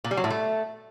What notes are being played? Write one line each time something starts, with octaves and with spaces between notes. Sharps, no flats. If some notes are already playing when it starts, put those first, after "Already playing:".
A#2
G3
F#3
A2
A3